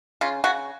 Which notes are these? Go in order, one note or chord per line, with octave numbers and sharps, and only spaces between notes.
C#3 F4
C#3 F#4